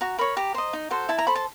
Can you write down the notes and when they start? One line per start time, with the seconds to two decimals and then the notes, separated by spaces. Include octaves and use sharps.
0.01 F#4 A#5
0.19 A#4 C#5 B5
0.37 G4 A#5
0.54 C5 D#5
0.73 D#4
0.90 F#4 A4 C5
1.09 E4 A5
1.18 A#5
1.27 A4 C5 B5
1.35 A5